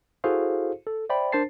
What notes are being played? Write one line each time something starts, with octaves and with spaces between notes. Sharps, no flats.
E4 F#4 G#4 A4 C5 F5
A4
C5 D5 E5 G5 B5
D4 A#4 C5 A5 A6 C7